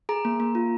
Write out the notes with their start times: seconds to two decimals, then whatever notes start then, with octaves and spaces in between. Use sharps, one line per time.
0.09 G#4 A#5
0.25 A#3
0.40 A#3
0.55 F4